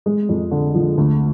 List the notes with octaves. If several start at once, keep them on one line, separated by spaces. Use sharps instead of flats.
G#3
F2
D3
F3
D2